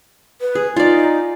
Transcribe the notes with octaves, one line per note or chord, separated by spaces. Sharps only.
B4
G#4
D#4 F4 D5